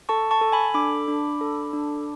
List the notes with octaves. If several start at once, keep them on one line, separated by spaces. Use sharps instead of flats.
A4 A5 C#6
A5 C#6
A4
G#5 B5
D4 B5 D6
D4
A4
D4